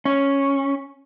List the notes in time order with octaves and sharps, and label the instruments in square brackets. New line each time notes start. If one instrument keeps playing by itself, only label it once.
[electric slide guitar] C#4